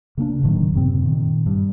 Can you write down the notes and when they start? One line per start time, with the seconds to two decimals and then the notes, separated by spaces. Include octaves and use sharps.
0.17 C#3 A#3 C4 D4
0.43 D1 A2 D#3 F#3
0.73 F#2 C3 C4
1.02 A#2 D#3
1.46 G2